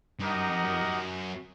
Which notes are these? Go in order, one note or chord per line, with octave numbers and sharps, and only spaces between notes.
G2 D#4 G4 A#4 D#5 F#5
F#2
F2
F#2
F2
F#2